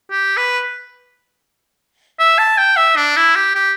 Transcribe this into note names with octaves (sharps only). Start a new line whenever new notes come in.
G4
B4
E5
A5
G5
E5
D4
E4
G4
G4